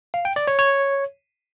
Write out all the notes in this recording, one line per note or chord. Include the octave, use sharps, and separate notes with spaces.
F5
G5
D5
C#5
C#5